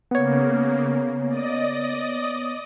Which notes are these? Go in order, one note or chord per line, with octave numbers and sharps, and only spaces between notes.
C#3 A#3 B3 C#5
D5 D#5 D#6